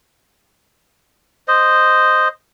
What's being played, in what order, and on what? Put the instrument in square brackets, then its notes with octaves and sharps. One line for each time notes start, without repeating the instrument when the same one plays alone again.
[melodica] C5 D#5